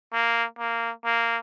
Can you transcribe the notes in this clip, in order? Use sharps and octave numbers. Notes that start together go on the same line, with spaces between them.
A#3
A#3
A#3